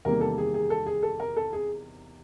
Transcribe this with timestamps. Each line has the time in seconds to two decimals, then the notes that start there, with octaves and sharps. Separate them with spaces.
0.05 E2 C3 D#3 G3 A#3 A#4
0.21 A4
0.38 G#4
0.54 G#4
0.70 A4
0.86 G#4
1.03 A4
1.20 A#4
1.37 A4
1.53 G#4